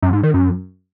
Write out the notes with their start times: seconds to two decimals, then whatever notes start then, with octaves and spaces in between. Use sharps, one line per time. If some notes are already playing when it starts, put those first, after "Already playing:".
0.02 F#2
0.13 G#2
0.23 D#3
0.34 F#2